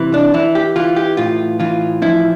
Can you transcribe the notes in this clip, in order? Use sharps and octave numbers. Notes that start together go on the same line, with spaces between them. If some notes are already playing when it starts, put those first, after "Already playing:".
Already playing: C3 E3
D4
E3 E4
G4
E3 F4
G4
A2 F4
E3 F4
F3 E4